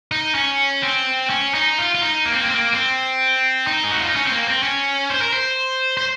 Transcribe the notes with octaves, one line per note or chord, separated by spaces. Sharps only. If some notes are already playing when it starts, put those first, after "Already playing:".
D#4
C#4
C4
C#4
D#4
F4
F4
D#4
A#3
C4
A#3
C4
A#3
C4
D#4
G#4
F#4
F4
D#4
C#4
C4
A#3
C4
C#4
C5
A#4
C5
C5